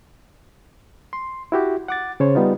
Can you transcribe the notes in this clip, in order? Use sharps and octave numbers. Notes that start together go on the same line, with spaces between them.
C6
E4 F#4 G4
F#5 D6 A6
C#3 C5 C#5
G3 B3 D#4 F4